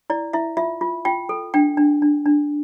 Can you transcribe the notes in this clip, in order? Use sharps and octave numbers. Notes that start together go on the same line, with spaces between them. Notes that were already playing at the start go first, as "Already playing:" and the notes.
E4 D5
E4 E5
F4 E5
F4
F4 G5
A4
D4 G5
D4
D4
D4